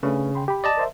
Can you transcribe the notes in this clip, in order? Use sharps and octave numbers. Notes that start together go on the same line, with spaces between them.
C#3 A3 C#4 D4 B4
G5 B5 C6
G4 B5
D5 D#5 A5
A#4 C5 E5